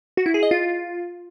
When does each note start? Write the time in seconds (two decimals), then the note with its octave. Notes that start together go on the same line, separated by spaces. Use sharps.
0.17 F#4
0.26 E4
0.34 G#4
0.43 D#5
0.51 F4